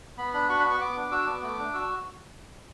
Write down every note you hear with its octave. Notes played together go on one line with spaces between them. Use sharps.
B3 B5
D4 B5
F#4 C#6
B3 B5
C#6
B3 D6
D4
F#4 E6
B3 D6
A3
D4
F#4 E6